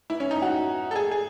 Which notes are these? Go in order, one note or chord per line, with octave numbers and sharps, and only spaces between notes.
E4
C#4
D#4
F#4
A4
G#4
G#4